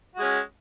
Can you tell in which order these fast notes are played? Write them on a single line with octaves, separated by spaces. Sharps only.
F#4 G#3 C#4